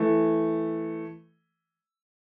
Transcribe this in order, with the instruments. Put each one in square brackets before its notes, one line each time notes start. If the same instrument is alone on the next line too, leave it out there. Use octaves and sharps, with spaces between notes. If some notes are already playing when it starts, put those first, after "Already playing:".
Already playing: [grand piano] E3 A3